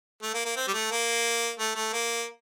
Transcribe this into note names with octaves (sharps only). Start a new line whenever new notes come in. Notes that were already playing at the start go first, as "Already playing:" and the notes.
A3
A#3
A#3
C4
G3
A3
A#3
A3
A3
A#3